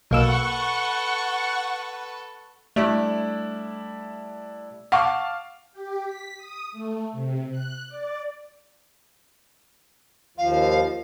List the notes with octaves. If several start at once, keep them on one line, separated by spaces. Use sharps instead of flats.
B1 A#3 A4 B4 F#5 C#6 E6
G3 A3 D4 E4
F5 F#5 A5 C#6 D6
G4
B6
D#6
A3
C3
F#6
D5
D#2 F3 F5